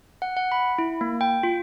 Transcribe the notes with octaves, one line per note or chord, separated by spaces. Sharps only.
F#5
F#5
B5
E4
A#3
G5
F4